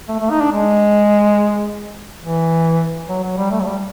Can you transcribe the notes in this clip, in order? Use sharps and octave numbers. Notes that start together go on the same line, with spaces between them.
A3
A3
D#4
D4
G#3
E3
F#3
F#3
G3
A3
F#3
G3